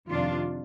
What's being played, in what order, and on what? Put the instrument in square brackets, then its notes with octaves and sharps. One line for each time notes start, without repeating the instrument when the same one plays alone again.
[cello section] F2 C3 D#3 D4 F4